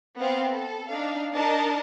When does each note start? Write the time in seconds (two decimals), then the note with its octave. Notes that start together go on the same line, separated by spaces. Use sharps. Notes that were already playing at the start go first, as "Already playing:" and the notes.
0.18 B3 C4 F5
0.52 A4
0.92 D4 D#4 F5
1.35 D4 D#4 A#4 D#5 A5